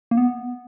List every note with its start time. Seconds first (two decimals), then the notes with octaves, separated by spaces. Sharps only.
0.11 A#3
0.17 B3